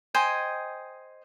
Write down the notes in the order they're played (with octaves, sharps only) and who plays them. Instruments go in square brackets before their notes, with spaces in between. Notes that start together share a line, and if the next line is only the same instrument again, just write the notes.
[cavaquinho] C5 D#5 G5 G#5